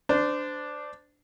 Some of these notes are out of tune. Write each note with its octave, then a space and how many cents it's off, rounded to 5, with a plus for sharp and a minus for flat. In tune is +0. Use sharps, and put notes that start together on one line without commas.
D4 +0 C5 -25